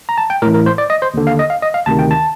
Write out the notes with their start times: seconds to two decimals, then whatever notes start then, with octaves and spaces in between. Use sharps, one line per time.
0.09 A#5
0.18 A5
0.30 G5
0.42 A1 A2 A#4
0.54 A#4
0.66 C5
0.78 D5
0.90 D#5
1.02 C5
1.14 D#2 D3
1.27 F5
1.39 D#5
1.50 F5
1.62 D#5
1.74 F5
1.86 D2 C3 D#3 A5
1.99 G5
2.11 A5